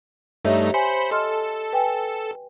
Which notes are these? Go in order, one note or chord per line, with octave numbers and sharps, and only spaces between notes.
G2 A3 D#4 G4 C#5 E5
C5 G#5 B5 C#7
A4 D#5 C6 F6
B4 G5 G#5